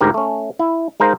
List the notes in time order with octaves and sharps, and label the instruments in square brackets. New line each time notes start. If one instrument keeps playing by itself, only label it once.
[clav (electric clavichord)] D2 G#2 G4 A#4
A3 C#4
E4
G#3 D#4 A#4 C5 F5